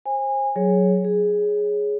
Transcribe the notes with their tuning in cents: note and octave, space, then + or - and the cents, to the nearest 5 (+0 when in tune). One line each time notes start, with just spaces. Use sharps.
C5 +25 G#5 -25
F#3 +0 G#4 +0 C#5 +0
G#4 +0 C#5 +0